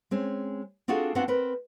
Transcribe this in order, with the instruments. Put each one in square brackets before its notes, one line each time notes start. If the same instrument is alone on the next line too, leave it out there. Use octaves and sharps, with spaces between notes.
[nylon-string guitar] G#3 C4 C#4
C4 D4 F4 F#4 G#4 A4
B3 C4 D4 F4 F#4 F#5
C4 A#4 B4